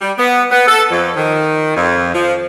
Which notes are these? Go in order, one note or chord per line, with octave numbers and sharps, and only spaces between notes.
G3
B3
B3
A4
F2
D#3
F2
F3